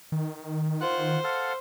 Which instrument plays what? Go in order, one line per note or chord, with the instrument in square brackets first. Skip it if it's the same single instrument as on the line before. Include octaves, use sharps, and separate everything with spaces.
[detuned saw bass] D#3
[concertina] F4 F#5 F#6 [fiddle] C5
[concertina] A4 F5 F#5